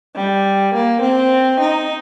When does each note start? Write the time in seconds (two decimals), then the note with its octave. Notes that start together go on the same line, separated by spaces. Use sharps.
0.15 G3
0.74 A#3
1.02 C4
1.60 D#4